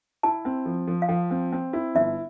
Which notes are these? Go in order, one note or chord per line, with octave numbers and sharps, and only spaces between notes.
E4 A5
C4
F3
F3
F5
F3 G5
C4
C4
E4
G1 E5